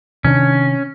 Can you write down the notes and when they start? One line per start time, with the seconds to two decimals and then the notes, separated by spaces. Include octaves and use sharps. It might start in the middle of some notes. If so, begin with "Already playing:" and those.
0.25 C3 D#3 C#4 D4